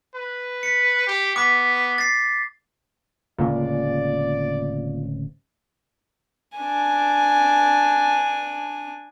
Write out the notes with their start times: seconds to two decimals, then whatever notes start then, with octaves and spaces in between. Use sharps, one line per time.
0.15 B4
0.63 B6 C#7
1.07 G4
1.36 B3 D6 B6
1.98 A6 C7
3.38 D1 C#3 G#3 A#3 F4 D5
6.57 D4 G#5